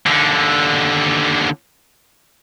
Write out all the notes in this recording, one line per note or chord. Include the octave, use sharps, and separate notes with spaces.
D#2 D3